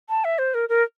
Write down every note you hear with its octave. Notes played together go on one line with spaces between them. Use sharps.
A5
E5
C5
A#4
A#4